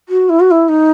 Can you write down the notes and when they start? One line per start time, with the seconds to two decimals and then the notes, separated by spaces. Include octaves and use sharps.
0.09 F#4
0.29 E4
0.40 F#4
0.51 E4
0.69 D#4